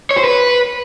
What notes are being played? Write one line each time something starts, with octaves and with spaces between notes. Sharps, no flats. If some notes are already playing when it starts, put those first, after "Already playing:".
C#5
C5
B4